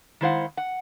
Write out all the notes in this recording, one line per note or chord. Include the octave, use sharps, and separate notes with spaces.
D#3 G#3 E4 C5 F5 F#5
F#5